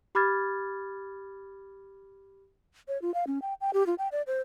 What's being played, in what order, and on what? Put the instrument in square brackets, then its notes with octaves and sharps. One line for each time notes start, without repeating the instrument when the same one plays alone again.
[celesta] G4 B5 D6 F6 G#6 A6
[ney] C#5
F4
F5
C#4
G5
G5
G4
F4
G5
D5
C5